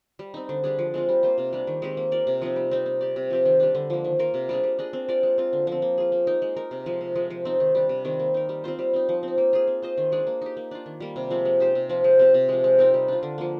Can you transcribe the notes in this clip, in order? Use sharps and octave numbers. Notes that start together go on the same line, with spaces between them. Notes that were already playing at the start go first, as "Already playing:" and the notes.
G3
C4 D#4
D3
G3 D4 G#4
F3
G#3 C4 F4
G3
A#3 F4 C5
C3
G3 D4
D#3
G#3 C4 G4
A#3
F4 A#4 D5
C3
F3 C4 D#4
G3
C4 D#4
C4
G4 D5
C3
F3 C4 G4
D#3
G3 D4
D3
F3 A#3
D#3
A#3 F4 A#4
C3
G3 D4 G#4
G3
D4 G#4 D#5
C4
F4 A#4 D5
G#3
C4 F4
D3
F3 C4
A#3
F4 G#4
A#3
D#4 A#4
G#3
D#4 A#4
C3
F3 G#3
C3
F3 G#3
F3
C4 D#4
D#3
G3 D4
C3
D#3 G3 C4
A#3
D#4 A#4
G3
C4 F4 C5
G3
C4 D#4
F3
C4 D#4
A#3
F4 G#4
C4
F4 C5 D#5
D#3
G#3 D4 G#4
A#3
D#4 G4
A#3
D4 F4
D#3
G3 A#3
C3
F3 G#3 C4
G#3
D#4 G4 C5
C3
F3 C4 F4
G#3
C4 G4 C5
C3
F3 G#3
G#3
C4 D#4 A#4
G3
D4 F4
D3
F3 A#3